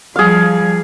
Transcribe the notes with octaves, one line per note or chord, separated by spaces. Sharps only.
F3 G3 G#4 F5